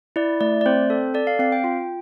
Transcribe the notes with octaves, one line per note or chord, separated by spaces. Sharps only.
E4 D5
A3 D5
D5
C4 C5
A4
A4 D5
F5
C4 F5
G5
F4 G5